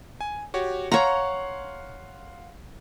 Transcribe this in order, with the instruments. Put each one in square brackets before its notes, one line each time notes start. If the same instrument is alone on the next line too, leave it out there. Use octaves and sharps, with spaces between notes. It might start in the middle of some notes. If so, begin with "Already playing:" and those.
[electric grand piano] G#5
F#4 G4 C#5
[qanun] C#5 A#5 [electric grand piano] F5 F#5 C6